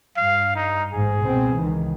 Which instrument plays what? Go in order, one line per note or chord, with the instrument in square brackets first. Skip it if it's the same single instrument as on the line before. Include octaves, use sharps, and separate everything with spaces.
[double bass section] G2 [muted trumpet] F5
[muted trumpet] D#4
[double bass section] A1 G#2 [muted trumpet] G#4
[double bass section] C#2 B2 C4
C#2 D#3 E3